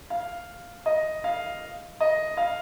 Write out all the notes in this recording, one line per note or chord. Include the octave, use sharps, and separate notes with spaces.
F5
D#5
F5
D#5
F5